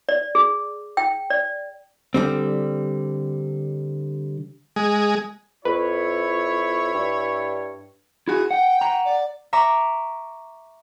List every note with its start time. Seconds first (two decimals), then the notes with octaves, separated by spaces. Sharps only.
0.09 D5
0.35 G#4
0.97 G5
1.30 D5
2.14 D3 G3 C4
4.76 G#3
5.65 F2 E4 B4 C#5
6.94 G2
8.28 E4 F#4 G#4
8.51 F#5 G5
8.81 F#5 A#5
9.05 D5
9.53 E5 A#5 C#6 D6